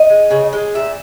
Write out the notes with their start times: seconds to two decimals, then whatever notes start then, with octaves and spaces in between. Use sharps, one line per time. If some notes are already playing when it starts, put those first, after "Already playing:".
Already playing: D#5
0.10 G#3
0.31 C#3
0.53 G#3
0.75 A#2 E5